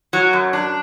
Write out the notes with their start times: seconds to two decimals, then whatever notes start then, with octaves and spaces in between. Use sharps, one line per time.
0.13 F#3
0.33 F#2
0.53 D4